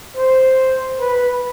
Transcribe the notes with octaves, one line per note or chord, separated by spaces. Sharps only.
C5
B4